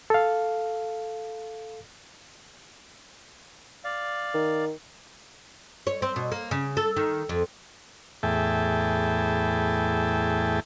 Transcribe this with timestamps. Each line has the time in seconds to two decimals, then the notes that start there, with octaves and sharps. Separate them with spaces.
0.10 A4 F5
3.84 D5 F5
4.34 D#3
5.87 C#5
6.02 C4
6.16 B2
6.32 A#3
6.51 C#3
6.77 A4
6.96 D#3
7.29 F2
8.23 E2 A2 G#4 E5 G5 A5